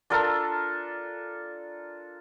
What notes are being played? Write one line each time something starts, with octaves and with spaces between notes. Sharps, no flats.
D4 F4 A4 A#4